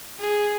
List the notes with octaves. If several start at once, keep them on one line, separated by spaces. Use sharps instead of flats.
G#4